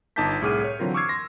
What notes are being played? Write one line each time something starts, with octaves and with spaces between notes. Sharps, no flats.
G1 D#4 A5 D6 G6 B6
C2 A2 G#4 D6 F6 D#7
C#5
D3 E3 F#3 C4 F4 A#4
C#6 D6 E6 F6 G#6 C7
C6 A#6